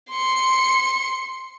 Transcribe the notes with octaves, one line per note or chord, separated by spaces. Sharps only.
C6 C#7